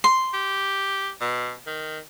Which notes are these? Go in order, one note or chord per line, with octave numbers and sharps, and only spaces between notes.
C6
G4
B2
D#3